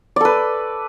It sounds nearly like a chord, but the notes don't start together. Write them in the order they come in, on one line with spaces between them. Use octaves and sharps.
D5 A4 B4